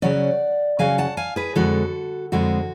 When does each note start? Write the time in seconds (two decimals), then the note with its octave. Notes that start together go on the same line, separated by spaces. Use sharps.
0.02 C#3 F#3 C#4 D5 F#5
0.79 C#3 F#3 C#4 F5 G#5
0.98 F#5 A5
1.17 F5 G#5
1.36 G#4 B4
1.55 F2 D3 G#3 F#4 A4
2.32 F2 D3 G#3 F#4